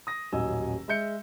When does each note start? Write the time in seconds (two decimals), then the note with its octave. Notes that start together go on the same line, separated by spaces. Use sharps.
0.07 D#6 A#6
0.32 D#1 A1 F#3 D#5 G#5 E6
0.88 G#3 E5 G6 C#7